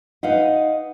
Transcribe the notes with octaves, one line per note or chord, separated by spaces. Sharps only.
D#4 B4 D#5 F5 F#5